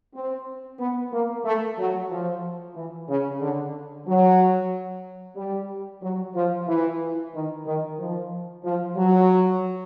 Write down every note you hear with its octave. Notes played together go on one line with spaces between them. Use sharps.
C4
B3
A#3
A3
F#3
F3
E3
C#3
D3
F#3
G3
F#3
F3
E3
D#3
D#3
F3
F3
F#3